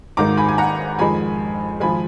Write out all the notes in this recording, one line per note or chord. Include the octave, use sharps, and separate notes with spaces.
G#1 G#2 D#3 G#3 A#5 D6
G#5 B5
G#5
F#5 A#5
F2 D#3 G#3 G#5 B5
G#1 F3 G#3 G#5 B5